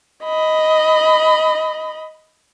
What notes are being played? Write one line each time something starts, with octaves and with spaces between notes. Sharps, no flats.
D#5 B5